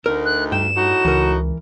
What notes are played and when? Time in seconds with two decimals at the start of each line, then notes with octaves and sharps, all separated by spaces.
0.06 D2 D#4 A#4
0.25 F#6
0.52 G2 G5 E7
0.76 A2 D#4 F#4
1.05 C#2 E3 A#4